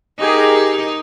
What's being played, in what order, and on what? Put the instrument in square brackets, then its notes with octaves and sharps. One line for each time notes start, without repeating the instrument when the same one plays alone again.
[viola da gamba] D#4 [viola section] G4 G#4 A#4